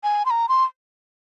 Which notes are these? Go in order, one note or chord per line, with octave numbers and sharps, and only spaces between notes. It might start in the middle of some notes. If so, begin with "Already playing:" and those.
G#5
C6
A#5
C6